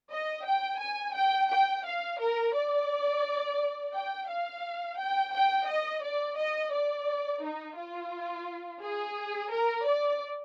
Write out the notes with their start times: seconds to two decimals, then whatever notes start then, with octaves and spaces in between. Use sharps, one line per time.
0.11 D#5
0.45 G5
0.79 G#5
1.14 G5
1.50 G5
1.85 F5
2.20 A#4
2.54 D5
3.94 G5
4.28 F5
4.98 G5
5.33 G5
5.67 D#5
6.03 D5
6.38 D#5
6.73 D5
7.43 D#4
7.77 F4
8.82 G#4
9.51 A#4
9.87 D5